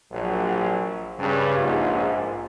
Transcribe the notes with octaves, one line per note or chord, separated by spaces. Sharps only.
A#1 F#3
G2 C#3
A#1 G#2